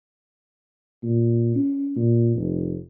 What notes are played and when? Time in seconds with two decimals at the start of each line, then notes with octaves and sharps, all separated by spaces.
1.03 A#2
1.55 C#4
1.96 A#2
2.35 F1